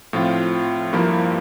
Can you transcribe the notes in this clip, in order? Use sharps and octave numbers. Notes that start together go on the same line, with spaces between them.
A2 F3 C4 F4
G2 F3 A#3 E4